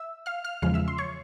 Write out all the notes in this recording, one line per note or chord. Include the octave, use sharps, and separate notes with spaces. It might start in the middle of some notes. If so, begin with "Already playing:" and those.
Already playing: E5 E6
F5 F6
F5 F6
E2 C#3 F3 G#3 F5 F6
E5 E6
C6
C#5 C#6